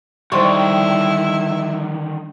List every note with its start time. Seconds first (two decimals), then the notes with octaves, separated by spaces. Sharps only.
0.32 D3 D#3 G3 E4 C5 C6 C#6